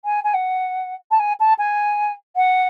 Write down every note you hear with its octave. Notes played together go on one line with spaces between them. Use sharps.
G#5
G#5
F#5
A5
G#5
A5
G#5
F#5